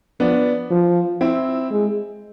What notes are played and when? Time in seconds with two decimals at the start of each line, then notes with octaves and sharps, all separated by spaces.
0.20 F3 B3 D4
0.70 F3
1.21 C4 E4
1.71 G#3